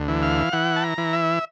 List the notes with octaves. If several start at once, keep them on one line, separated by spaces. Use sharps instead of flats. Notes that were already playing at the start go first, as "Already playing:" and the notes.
Already playing: D2
E3
F5
E3 F#5
A5
A#5
E3
E5